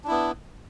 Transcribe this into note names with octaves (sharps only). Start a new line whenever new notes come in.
B3 D4 E4